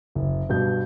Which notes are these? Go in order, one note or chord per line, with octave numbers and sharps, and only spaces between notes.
F#1
G2 B2 G6